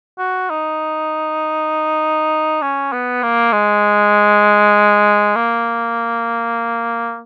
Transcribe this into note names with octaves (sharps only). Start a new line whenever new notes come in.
F#4
D#4
C#4
B3
A#3
G#3
A#3